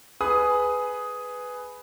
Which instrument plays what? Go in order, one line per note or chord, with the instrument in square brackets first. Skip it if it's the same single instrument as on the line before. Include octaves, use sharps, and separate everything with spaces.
[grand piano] G#4 B4 D#6